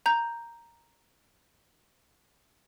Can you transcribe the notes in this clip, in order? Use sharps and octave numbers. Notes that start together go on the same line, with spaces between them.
A#5 G6